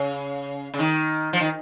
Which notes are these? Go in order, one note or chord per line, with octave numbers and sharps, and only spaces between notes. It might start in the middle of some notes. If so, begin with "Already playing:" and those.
Already playing: C#3
C#3
D#3
F3
D#3